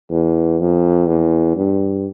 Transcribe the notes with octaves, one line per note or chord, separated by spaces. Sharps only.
E2
F2
E2
G2